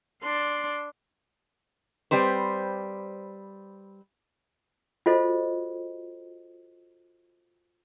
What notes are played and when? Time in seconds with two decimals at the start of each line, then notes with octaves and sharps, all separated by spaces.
0.23 D4 C6
2.11 G3 C4 B4 C5
5.06 F4 F#4 A4 C5 D#5